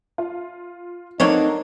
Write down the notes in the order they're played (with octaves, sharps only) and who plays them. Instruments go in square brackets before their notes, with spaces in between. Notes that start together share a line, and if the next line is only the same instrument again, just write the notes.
[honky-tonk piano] F4
[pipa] D3 A#3 C#5 [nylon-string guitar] C4 D4 [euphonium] D#4